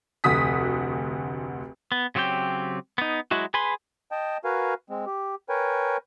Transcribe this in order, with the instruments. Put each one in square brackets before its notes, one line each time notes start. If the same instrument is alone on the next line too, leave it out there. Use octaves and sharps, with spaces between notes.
[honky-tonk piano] F1 D2 F#4 D#6 B6
[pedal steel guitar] B3
C#3 F#3 C4 G4 G5
B3 D#4
F#3 G#3 E4 F#4
G#4 B4 G#5 B5 C6
[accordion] D#5 G5 A5
F#4 A#4 B4 F5 G#5
G#3 C4
G4
A#4 B4 C#5 G5 G#5